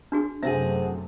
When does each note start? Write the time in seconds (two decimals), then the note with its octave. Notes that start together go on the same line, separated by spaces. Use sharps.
0.12 D4 F#4 G#4
0.43 F#2 C3 A3 C4 F#4 G#4 E5